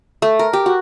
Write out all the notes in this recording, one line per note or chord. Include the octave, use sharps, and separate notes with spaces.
A3
A#4
G4
F#4